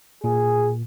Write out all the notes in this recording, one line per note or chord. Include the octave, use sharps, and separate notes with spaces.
A#2 G#4